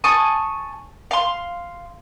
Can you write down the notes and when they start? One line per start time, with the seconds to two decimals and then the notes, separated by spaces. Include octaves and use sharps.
0.04 G#5 A5 C#6 D#6
1.11 F5 C6